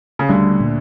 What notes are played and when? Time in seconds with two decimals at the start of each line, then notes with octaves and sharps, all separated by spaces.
0.19 C#3
0.29 D2 D3 G3
0.60 A#2